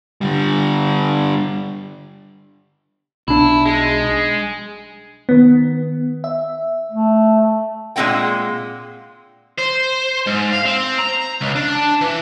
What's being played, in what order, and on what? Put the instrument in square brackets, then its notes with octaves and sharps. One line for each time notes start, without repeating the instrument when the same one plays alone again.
[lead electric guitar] D3 G3
[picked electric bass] B1 D4 [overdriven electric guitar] E4
[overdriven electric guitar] G#3
[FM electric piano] D#3 B3
E5
[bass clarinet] A3
[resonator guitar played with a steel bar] A#2 G#3 C4 F#5 G5
[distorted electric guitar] C5
G#2
F5
C4
A#5
C#2
D4
E3